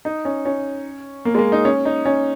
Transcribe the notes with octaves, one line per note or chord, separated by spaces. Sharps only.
D#4
C#4
C#4
A#3
G#3
A#3
D#4
C#4
D#4
C#4